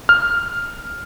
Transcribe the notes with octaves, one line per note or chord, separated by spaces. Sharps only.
F6